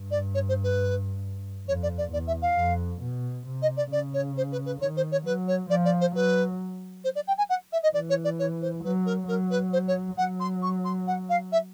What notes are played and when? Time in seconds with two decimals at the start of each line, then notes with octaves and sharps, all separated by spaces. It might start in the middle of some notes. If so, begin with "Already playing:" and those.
Already playing: G2
0.11 D5
0.34 C#5
0.49 C5
0.63 B4
1.68 F2 C#5
1.83 D5
1.98 D5
2.12 E2 D5
2.27 E5
2.42 F5
2.58 F2
3.02 B2
3.47 C3
3.62 D#5
3.77 D5
3.91 C#3 D5
4.14 C#5
4.37 C5
4.52 B4
4.66 B4
4.81 D#3 C#5
4.97 C5
5.11 C#5
5.26 F#3 B4
5.48 C#5
5.70 F3 D5
5.85 D5
6.01 C5
6.15 F#3 B4
7.04 C5
7.15 D5
7.27 G5
7.38 G#5
7.49 F#5
7.72 E5
7.83 D#5
7.94 E3 D5
8.09 C#5
8.24 D5
8.39 C#5
8.62 C5
8.84 F#3 B4
9.06 A#4
9.28 F#3 A#4
9.50 B4
9.73 C5
9.87 C#5
10.18 F#3 F#5
10.40 C6
10.62 C#6
10.84 C6
11.07 F#5
11.29 F5
11.52 E5